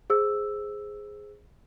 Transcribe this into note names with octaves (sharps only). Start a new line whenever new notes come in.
G#4 C5 E6